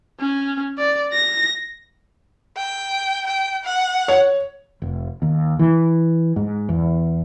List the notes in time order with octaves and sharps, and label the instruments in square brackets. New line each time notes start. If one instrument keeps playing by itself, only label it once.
[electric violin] C#4
D5
A#6
[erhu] G5
G5
F#5
[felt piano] C#5
[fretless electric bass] F1
D#2
E3
G#2
E2